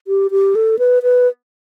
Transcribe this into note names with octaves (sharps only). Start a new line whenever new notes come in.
G4
G4
A4
B4
B4